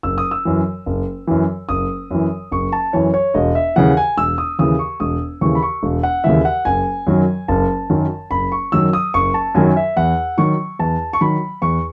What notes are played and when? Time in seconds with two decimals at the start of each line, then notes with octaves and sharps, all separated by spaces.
0.03 F#1 E6
0.18 D#6
0.31 E6
0.45 F#2 E3
0.86 F#1
1.27 F#2 E3
1.69 F#1 D#6
2.11 F#2 E3
2.51 F#1 C#6
2.72 A5
2.93 F#2 E3 C#5
3.14 C#5
3.34 E1 D#5
3.55 E5
3.76 D#2 C#3 E3 F#5
3.97 G#5
4.17 E1 E6
4.38 D#6
4.59 D#2 C#3 E3 D#6
4.79 C#6
5.00 E1 D#6
5.41 D#2 C#3 E3 C#6
5.55 B5
5.62 C#6
5.83 E1
6.03 F#5
6.24 D#2 C#3 E3 E5
6.45 F#5
6.65 F#1 G#5
7.07 F#2 D#3 F#3
7.48 F#1 A5
7.90 F#2 D#3 F#3
8.31 F#1 B5
8.52 C#6
8.72 F#2 D#3 F#3 E6
8.93 D#6
9.14 F#1 C#6
9.34 A5
9.55 F#2 D#3 F#3 G#5
9.76 E5
9.97 E2 F#5
10.38 D#3 F#3 C#6
10.79 E2 A5
11.13 C#6
11.21 D#3 F#3 B5
11.62 E2 C#6